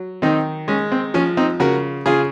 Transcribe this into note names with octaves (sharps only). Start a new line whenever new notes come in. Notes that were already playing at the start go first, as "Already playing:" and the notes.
Already playing: F#3
D#3 C4 D#4
G#3 C#4
C4
F3 C#4
C4 D#4
C#3 F#4 A#4
C#3 F4 G#4